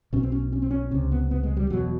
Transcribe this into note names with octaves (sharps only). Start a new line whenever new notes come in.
B1 B2 C#4
C4
C#4
C#4
C4
C#4
C#2 C3 C#4
B3
B3
G#3
G3
E1 E2 B2 F#3